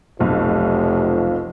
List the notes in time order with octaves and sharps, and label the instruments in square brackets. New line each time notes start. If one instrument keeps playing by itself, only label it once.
[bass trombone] F1 [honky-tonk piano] B1 B2 [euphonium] F3